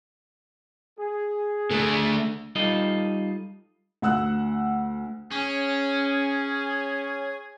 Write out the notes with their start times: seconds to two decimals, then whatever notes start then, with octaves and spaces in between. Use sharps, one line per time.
0.98 G#4
1.71 D3 A3
2.56 G3 D#4 F4 A4 D#5
4.02 D2 F#5 E6 F#6
5.31 C#4 G#4